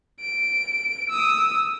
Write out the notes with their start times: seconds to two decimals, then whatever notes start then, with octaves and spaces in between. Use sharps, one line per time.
0.20 D7
1.09 D#6 E6